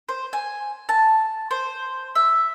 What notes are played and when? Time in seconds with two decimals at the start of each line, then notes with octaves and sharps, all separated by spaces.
0.09 C5
0.33 G#5
0.89 A5
1.51 C5
2.15 E5